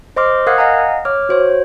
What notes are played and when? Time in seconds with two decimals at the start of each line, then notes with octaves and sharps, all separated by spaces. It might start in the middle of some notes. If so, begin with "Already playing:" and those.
0.16 C5 D#5 C6 D6 F6
0.47 A#4 F5 F#5 D#6 F#6 G#6
0.58 D#5 F5 F#5 G#5 A#5
1.05 C#5 D6 F6
1.29 F#4 C5 C#5